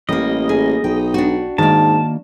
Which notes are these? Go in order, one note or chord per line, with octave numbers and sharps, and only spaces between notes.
A1 G3 A#3 D#5
G#4
B1 G5
D4 F#4
G#2 D#3 A#3 A5